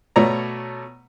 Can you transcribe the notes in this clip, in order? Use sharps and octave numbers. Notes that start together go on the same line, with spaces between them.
B2 A3 C#5 D5 A#5